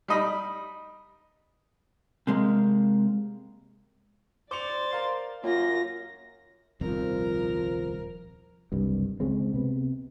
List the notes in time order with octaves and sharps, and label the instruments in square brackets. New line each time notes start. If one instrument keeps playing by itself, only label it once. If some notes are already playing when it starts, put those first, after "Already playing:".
[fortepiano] G3 D#4 D#5 B5
[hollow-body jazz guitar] C3 G#3 A#3
[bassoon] C5 [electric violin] D5 A6 [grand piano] D6 C#7 F7
[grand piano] A#4 F5 C6
[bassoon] F#2 [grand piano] A#3 [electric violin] F4 A#6
[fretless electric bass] D#1 C2 F2 [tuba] F3 [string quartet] A#4
[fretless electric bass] F#1 C2 G2
C#2 C#3 G#3 C4
C3 B3